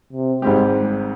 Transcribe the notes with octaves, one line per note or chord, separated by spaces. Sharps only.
C3
G#1 G#2 G3 G#3 C4 G4